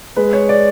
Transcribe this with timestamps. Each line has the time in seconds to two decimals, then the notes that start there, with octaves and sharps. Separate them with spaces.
0.16 G#3 B4
0.33 C#5
0.49 D5